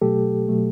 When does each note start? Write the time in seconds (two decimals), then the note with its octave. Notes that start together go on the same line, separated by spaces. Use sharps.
0.01 B2 F#3 A3 G4 A4
0.48 B2 F#3 A3